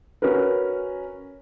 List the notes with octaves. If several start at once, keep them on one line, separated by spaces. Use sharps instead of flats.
C#4 F#4 A#4 B4